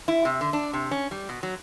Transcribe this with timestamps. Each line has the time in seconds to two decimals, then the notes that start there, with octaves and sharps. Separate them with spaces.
0.08 E4
0.25 C3
0.41 D3
0.53 D4
0.73 C3
0.91 C#4
1.11 G3
1.29 B2
1.43 F#3